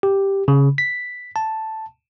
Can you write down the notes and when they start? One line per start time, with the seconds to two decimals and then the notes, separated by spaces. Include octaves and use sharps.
0.03 G4
0.48 C#3
0.78 B6
1.36 A5